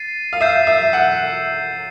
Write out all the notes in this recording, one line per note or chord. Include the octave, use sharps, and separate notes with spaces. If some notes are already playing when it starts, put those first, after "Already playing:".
Already playing: A6 C7 D#7
F5
E5 G6 C7 E7
E5
F#5